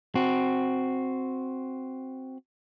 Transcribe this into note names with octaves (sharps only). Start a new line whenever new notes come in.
C4 F#4